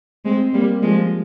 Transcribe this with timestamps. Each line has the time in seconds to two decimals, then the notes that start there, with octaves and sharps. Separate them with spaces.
0.25 G#3 C4
0.53 G3 A#3
0.82 F3 G#3